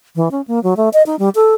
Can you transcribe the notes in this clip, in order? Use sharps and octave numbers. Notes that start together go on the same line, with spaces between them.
E3
C#4
A#3
F#3
A3
D#5
D#4
G3
A4